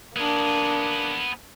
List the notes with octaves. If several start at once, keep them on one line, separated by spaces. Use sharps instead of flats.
A#3 B3 D4 G#4